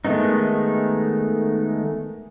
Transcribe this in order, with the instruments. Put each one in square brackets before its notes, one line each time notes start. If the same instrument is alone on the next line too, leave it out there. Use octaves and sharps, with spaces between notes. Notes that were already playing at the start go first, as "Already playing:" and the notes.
[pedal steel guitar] D#3 G#3 A3 B3 D#4